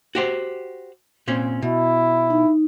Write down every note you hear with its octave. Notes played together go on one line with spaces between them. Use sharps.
F#4 G4 C5
A#2 C4 C#4
B2 E4
D#4